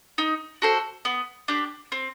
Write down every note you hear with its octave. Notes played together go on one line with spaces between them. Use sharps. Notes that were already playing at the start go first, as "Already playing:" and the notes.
D#4
F#4 A4 C5
B3
D4 G4
C4